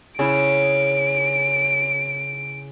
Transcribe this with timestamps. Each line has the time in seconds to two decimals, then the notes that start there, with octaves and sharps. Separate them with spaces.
0.19 C#3 E4 D7